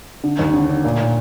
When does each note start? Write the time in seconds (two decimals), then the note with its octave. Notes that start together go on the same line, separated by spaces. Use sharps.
0.24 D3
0.39 D#2
0.54 D3
0.69 D3
0.84 A#2
0.99 A#2